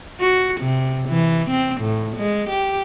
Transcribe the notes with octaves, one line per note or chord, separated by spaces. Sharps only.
F#4
C3
E3
C4
A2
G#3
G4